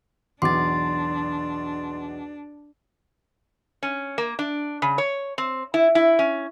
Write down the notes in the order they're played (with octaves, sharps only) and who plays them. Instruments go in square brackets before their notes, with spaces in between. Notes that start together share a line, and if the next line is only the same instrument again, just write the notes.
[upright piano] B1 E2 D6 [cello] D4 [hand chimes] C6 A6
[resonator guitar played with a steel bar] C#4
A#3
D4
C#3
C#5
C4
E4
E4
C#4